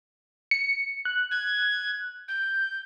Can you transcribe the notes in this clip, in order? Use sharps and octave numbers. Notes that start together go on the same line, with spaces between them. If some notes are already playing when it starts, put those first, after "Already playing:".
C#7
F#6
G#6
G6